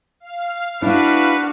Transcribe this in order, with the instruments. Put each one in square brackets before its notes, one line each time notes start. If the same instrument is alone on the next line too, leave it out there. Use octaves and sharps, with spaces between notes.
[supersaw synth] F5
[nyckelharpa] D4 F#4 [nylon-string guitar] E4 [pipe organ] B4